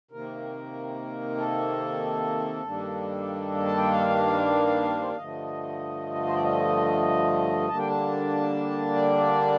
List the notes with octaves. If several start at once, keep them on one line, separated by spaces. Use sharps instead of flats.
C3 D#3 A#3 A#4
A4
G2 D#3 G3 A#3 D4
A5
G5
F5
C5
D5
G2 D3 F3 A3 D#5
C5
D5
D#5
D3 G3 A#3 D4 A5
G5
A5
D5